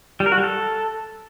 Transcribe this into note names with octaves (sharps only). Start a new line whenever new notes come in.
G3
A#4
F#4
G3
A4